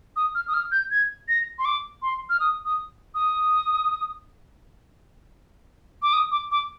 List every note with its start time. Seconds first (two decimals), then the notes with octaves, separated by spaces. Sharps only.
0.16 D#6
0.35 F6
0.48 D#6
0.54 F6
0.72 G6
0.91 G#6
1.28 A#6
1.59 C6
1.65 D6
2.02 C6
2.30 F6
2.40 D#6
2.65 D#6
3.15 D#6
6.02 D6
6.13 D#6
6.31 D6
6.51 D6